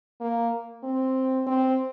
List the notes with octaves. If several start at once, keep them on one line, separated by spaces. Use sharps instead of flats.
A#3
C4
C4